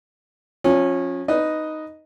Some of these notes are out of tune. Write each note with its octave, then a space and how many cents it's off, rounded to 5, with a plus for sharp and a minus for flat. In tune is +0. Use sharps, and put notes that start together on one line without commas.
F3 +25 C#4 -20
D#4 +0 B4 +0 D#5 +0